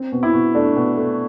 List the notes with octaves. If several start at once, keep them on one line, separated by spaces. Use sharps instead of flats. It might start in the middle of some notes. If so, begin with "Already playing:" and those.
Already playing: C4
B2
E4
B2
A3 D4
B2
A3